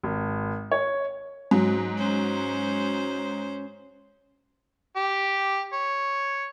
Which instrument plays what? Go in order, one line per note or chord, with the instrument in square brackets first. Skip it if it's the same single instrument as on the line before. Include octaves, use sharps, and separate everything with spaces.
[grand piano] G#1
C#5
[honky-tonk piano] G#2 F#3
[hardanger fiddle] C#4 C5
[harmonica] G4
C#5